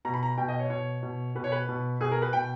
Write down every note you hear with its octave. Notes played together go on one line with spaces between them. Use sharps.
B2 A#5
B5
A#5
B2 G5
D#5
C#5
B2 C#5
B2
B2 B4
C#5
B4
B2
B2 G#4
A#4
B4
B2 G5